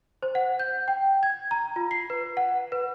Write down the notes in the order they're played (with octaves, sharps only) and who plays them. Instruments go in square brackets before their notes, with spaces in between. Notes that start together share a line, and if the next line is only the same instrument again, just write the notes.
[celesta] C5
F#5
G6
G5
G#6
A#5
F4
C7
B4
F#5
B4